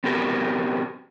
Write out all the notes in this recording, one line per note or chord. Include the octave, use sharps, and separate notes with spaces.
B3 C4 F#4 G4 A#4